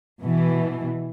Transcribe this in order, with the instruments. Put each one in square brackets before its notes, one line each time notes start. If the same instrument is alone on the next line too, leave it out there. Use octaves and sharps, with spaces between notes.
[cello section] B2 E3